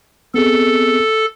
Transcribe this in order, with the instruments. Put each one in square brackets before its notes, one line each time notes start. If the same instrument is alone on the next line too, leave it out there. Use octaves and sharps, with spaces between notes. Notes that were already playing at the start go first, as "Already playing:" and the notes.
[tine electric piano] B3 C4 G#4 [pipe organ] A4